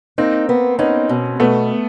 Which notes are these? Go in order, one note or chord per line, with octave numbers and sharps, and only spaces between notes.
A#3 C4 D#4
B3
B3 C#4 D#4
B2
B2 A3 B3